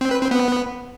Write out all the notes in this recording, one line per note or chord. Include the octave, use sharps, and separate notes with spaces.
C4
B4
C4
B3